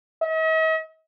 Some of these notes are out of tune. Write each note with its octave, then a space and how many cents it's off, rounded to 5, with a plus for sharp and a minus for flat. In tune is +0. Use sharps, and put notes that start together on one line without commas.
D#5 +45